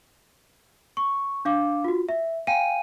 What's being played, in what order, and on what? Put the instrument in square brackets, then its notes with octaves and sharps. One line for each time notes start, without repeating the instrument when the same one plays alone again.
[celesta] C#6
D4 F5 D6
F4 F#4
E5
F5 G5 G#5 D#7